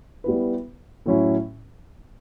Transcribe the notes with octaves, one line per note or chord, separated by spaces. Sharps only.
G3 B3 E4 B4
A2 F#3 C#4 E4